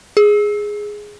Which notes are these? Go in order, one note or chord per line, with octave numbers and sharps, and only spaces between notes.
G#4